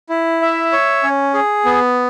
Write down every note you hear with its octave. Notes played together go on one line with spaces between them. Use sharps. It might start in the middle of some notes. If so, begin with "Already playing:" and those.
E4
E5
C#5
C#4
G#4
B3